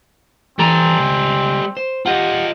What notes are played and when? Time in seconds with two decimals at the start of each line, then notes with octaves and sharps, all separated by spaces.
0.59 E3 G3 C4 A4 G#5 A#5
0.99 C#2
1.77 C5
2.06 F4 G4 D#5 F#5